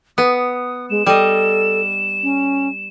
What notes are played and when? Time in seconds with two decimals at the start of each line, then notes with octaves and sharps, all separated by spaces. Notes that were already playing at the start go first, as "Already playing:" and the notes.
0.18 B3 D#6
0.90 G#3 E7
1.06 G3 A4 D#5
2.23 C#4